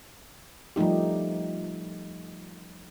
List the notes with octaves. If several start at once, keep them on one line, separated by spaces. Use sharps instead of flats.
F3 G3 A3 D#4 G4